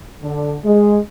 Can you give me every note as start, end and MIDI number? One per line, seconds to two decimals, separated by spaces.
0.22 0.54 50
0.64 0.97 56